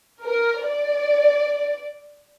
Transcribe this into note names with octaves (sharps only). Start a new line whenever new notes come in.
A#4
D5